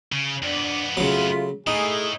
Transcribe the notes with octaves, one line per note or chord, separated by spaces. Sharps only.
C#3
F2 B3 D4 D5
C#3 F#3 A3 F4
A2 A3 D#4 G#4